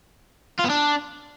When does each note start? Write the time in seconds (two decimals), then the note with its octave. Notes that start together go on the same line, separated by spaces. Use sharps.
0.59 F4
0.64 B3
0.70 D4